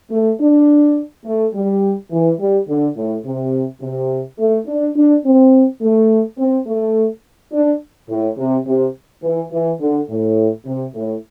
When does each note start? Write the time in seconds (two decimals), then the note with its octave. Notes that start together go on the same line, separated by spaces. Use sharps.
0.11 A3
0.40 D4
1.25 A3
1.54 G3
2.11 E3
2.39 G3
2.68 D3
2.96 A2
3.24 C3
3.81 C3
4.38 A3
4.67 D4
4.96 D4
5.25 C4
5.81 A3
6.38 C4
6.66 A3
7.52 D4
8.09 A2
8.37 C3
8.66 C3
9.23 E3
9.52 E3
9.80 D3
10.09 A2
10.66 C3
10.94 A2